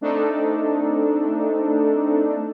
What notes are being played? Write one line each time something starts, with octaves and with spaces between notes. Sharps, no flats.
A3 C4 D4 D#4 A4